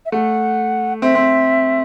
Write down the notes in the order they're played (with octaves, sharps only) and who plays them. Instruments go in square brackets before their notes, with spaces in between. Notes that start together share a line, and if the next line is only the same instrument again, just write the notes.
[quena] E5
[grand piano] A3 [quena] F#5
[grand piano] C4 [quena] E5
[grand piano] C4